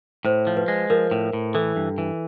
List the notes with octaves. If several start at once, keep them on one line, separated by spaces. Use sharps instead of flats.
A2 C5
F3
B4
G#3
F3 A#4
A2
A2
E3 A4
G2
E3